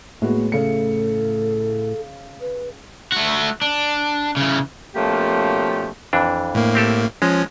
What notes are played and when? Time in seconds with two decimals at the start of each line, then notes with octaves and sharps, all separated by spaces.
0.22 A2 G#3 A#3 B3 F#4
0.52 C#3 A4 C#7
2.41 B4
3.12 A3 F#4
3.62 D4
4.37 C#3 E3
4.95 B2 F3 A3 A#3 C#4 G4
6.13 F2 E3 D4
6.55 A2 A#3
6.75 C4 G4 A4
7.22 F3 G#3 C#4